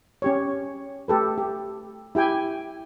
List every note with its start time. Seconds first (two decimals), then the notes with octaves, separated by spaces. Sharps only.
0.22 C#4 G4 C#5
1.08 A3 G4 A4 B4
1.38 G4
2.15 E4 G4 G5 G#5